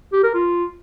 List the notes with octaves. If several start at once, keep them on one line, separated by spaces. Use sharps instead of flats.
G4
A#4
F4